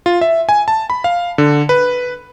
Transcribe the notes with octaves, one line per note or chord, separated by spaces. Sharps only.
F4
E5
G#5
A5
B5
F5
D3
B4